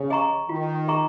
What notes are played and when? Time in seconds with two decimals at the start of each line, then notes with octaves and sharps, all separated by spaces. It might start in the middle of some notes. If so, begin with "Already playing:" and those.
Already playing: C#3
0.10 G#4 D#5 A#5 C#6
0.49 D#3 F4
0.88 G#4 D#5 A#5 C#6